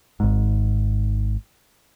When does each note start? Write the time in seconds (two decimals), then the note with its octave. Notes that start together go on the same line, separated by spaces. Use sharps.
0.20 G#1 G#2